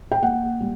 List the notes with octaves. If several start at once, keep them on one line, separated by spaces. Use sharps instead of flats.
G5
A#3 F#5
G3